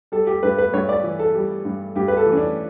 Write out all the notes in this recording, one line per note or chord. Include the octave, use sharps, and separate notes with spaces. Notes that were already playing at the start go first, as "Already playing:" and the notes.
G3 A4
G4
G2 B4
B4
G2 C#5
D5
E3
A4
G3
G2
G2 G4
B4
A4
E3
C#4
D4